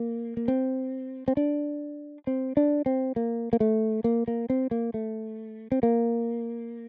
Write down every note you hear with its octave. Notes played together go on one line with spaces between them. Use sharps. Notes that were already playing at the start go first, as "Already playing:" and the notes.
Already playing: A#3
A#3
C4
C4
D4
C4
D4
C4
A#3
A#3
A3
A#3
A#3
C4
A#3
A3
C4
A#3